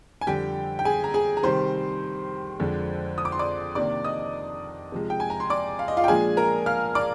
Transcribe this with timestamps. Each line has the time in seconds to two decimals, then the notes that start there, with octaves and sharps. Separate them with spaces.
0.21 G#5
0.27 F2 D3 G3 G4 G5
0.79 G5
0.85 G#4 G#5
1.04 A#5
1.14 G#4 G#5
1.37 A#5
1.43 C3 D#3 G3 C5 C6
2.60 F2 D3 G#3 D4
3.18 D#6
3.25 D6
3.32 C6
3.39 D5 D6
3.75 C3 D#3 A#3 D4 D5 D6
4.04 D#5 D#6
4.92 C3 F3 G#3
5.10 G5
5.20 G#5
5.30 A#5
5.40 C6
5.50 D5 D6
5.79 F5
5.88 D#5
5.97 F4 F5
6.04 G5
6.08 A#2 F3 G#3 D4 G#4 G#5
6.37 A#4 A#5
6.66 F5 F6
6.95 D5 D6